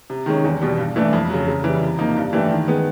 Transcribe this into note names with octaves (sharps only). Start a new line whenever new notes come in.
C3
D#3 G#3 C#4
E2
B2 G3
G2
E3 A3 D4
F2
C#3 F#3
C#3
E3 G3
C3
F3 A#3 D#4
G2
E3 A3 D4 G4
D#3
G#3 B3